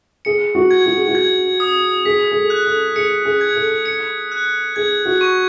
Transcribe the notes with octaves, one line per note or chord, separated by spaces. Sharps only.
G#4 C#7
F#4
G#6
F#4
G#4
F#4
G#6
D#6
G#4 B6
G#4
A4
F#6
A4
G#4 C#7
G#4
G#6
A4
C#7
F#6
G#4 G#6
F#4
C#6